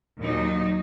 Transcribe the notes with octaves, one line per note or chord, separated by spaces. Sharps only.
D#2 A#2 F#3 D#4